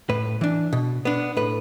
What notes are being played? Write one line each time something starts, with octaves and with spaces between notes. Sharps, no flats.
A2 B4
E3 D4
B2
B3 D4
A2 B4